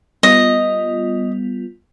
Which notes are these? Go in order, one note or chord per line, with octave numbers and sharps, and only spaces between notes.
G3 B3 F4 D#5